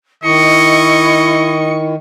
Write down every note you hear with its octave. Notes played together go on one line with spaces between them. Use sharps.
D#3 E4 D#5 C#6 C#7